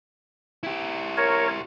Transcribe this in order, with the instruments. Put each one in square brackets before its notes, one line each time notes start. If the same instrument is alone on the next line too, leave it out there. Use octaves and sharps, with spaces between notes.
[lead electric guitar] E4 G4
[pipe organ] A#4 C#5